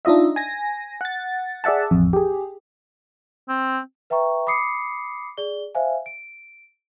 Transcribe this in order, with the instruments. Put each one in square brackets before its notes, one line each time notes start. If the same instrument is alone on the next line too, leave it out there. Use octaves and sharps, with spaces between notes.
[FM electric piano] D4 D#4 F4 D#5 E5
G#5 A#6
F#5 A6
G#4 D5 E5 F#5 A5
A1 F2
G4 G#4
[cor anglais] C4
[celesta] B4 E5 G5 A#5 C#6
B5 D6 D#6 C7 C#7
G#4 D5 G7
C5 E5 F5 G#5
D7